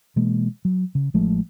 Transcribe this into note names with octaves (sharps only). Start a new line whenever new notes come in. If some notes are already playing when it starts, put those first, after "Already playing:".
B2 E3 G#3 A#3
F#3
C#3
A1 F3 G#3 A3